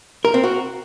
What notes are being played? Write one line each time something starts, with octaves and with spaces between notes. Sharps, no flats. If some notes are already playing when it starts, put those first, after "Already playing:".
A#4
C4
F#4